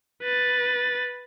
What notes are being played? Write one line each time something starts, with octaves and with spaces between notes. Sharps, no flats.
B4 A6